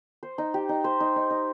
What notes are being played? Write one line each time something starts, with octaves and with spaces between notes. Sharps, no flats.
C5
D#4
G4
D#4
C5
D#4
D#4
D#4